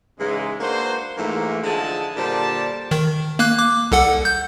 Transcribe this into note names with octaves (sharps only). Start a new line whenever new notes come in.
G#2 C#3 E3 G#3
A#3 D4 F#4 B4 C5
G#2 E3 F3 A3 A#3
D3 F3 E4 G#4 D#5 A5
A#2 D3 G3 C5 D5 A5
D#3
A#3 F#6
D6
C2 A4 F#5
G6